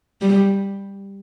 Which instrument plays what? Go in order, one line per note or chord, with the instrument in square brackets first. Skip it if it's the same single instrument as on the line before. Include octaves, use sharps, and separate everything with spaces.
[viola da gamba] G3